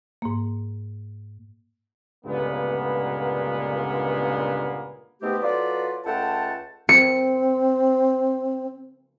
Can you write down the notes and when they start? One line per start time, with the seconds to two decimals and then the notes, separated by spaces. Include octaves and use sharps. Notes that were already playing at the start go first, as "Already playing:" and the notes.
0.22 G#2 A#3
2.26 C#2 G2 A#2 D3 A#3 B3
5.22 G#2 B2 A3 B3 C4 G4
5.43 F#3 F4 A4 B4 D5
6.05 C#2 A3 F4 F#5 G5 A5
6.89 C4 C#7